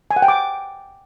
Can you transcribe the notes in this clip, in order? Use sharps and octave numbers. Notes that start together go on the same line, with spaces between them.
G#5
F#5
G5
D6